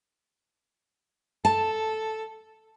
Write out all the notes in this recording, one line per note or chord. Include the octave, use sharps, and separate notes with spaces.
A4 A5